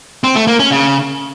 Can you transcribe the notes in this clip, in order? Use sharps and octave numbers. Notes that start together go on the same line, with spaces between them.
C4
A3
A#3
C#4
C#3